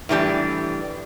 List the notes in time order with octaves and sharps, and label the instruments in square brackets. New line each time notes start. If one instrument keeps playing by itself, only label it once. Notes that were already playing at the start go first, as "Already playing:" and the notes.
[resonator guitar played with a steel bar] A2 E3 G3 D4 G4